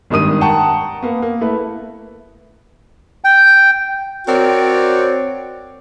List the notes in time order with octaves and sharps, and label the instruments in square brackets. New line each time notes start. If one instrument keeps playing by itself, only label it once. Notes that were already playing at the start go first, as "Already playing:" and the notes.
[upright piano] G#1 G2 D#3 D#6 D#7
F#5 G5 A5 A#5 C#6
A#3 B3
A#3
A3 E4 B4
[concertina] G5
[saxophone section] C4 F#4 A#4 C#5 D5